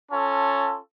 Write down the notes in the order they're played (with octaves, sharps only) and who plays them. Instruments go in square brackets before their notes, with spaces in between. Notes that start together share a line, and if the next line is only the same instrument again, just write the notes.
[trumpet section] C#4 F4 A4 A5